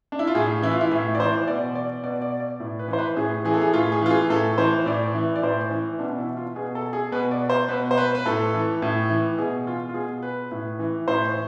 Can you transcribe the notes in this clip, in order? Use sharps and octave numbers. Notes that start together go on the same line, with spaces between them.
D4
E4
F4
A2 G#4
E3 E4
F4
E4
A2 E4
D5
E3 C5
B2 D5
D5
B2 D5
D5
D5
A2
B4
E3
C5
B4
A2 G#4
E3 G#4
A4
G#4
A2 F4
G#4
E3 F4
G#4
A2 A4
E3 C5
A2 D5
E3
D5
A2 C5
E3
B2 D4
D4
E4
F4
B2 G#4
A4
G#4
B2 B4
D5
C5
B2 B4
C5
B4
B4
A2 A4
E3
A2
E3
B2 G#4
F4
F4
B2 G#4
B4
A2
E3
A2 C5